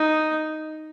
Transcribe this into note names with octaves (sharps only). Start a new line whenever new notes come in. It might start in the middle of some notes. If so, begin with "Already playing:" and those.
Already playing: D#4